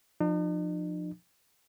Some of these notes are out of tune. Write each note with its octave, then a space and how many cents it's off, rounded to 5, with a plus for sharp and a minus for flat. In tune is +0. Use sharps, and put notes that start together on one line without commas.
F3 +10 D#4 -45